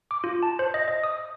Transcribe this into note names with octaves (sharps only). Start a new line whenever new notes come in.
D6
F4
A5
C5
D#5
D#5
D#6